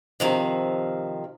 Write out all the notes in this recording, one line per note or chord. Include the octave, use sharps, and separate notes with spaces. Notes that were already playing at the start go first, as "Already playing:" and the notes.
C3 D#3 F3